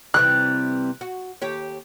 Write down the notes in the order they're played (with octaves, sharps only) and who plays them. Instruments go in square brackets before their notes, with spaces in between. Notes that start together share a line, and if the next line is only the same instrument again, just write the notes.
[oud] C3 E3 G3 [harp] F#6
[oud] F#4
D#2 G4 C#5